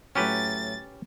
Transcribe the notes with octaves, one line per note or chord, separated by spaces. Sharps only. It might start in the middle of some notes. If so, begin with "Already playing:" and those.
A2 F#3 C#4 G4 B4 A6